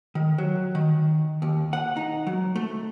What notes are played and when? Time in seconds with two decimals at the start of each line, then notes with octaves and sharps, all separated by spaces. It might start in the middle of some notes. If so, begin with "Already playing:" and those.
0.15 D#3
0.38 F#3
0.75 D#3
1.42 D#2
1.73 F#5
1.97 D#4
2.27 F#3
2.55 A3